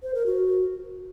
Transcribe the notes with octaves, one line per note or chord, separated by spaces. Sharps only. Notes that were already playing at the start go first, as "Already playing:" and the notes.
C5
A#4
F#4